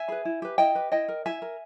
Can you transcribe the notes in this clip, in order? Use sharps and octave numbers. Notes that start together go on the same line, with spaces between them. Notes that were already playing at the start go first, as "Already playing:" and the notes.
Already playing: E5 G#5
G#4 B4
E4
G4 B4
E4 D#5 G5
G4 B4
E4 D#5 G5
A#4
E4 E5 G#5
A#4